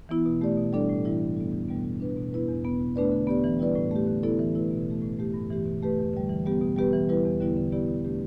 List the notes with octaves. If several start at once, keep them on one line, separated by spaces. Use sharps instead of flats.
E3 B3 E4
B2
A3 G4 D5
B2
G3 D4 A4 D5
A2
E3 G3 E4
G2
G3 B3
E2
B2 G3 B3
G3
D4 B4
B2
B3 E4 B4
E2
B2 B3
B2
A3 D4 B4 D5
D3
B3 G4 D5
E3
G3 E4 B4 D5
A2
A3 G4
D3
B3 E4 A4 D5
E3
A3 E4 B4
B2
A3 G4
A2
A3 G4
G2
E3 A3 G4
B2
A3 G4 B4
E2
D3 G3
E3
G3 B3 G4
B2
G3 B3 G4 B4
E3
G3 E4 B4
E2
D3 G3 B3 E4
D3
B3 E4 G4 D5
B2
A3 D4 G4